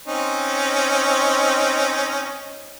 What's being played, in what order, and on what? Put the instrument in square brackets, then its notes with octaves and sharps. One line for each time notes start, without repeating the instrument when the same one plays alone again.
[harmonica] C4 C#4 D#4